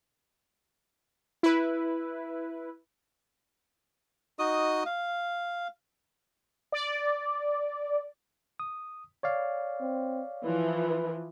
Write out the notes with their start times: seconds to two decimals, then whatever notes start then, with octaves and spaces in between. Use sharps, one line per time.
1.43 E4 B4
4.39 D#4 F#4 D#5 D#6
4.86 F5
6.72 D5
8.60 D#6
9.23 C#5 D5 F5
9.81 C4
10.44 E3 F3 B4